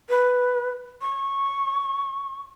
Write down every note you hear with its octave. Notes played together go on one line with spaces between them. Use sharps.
B4
C#6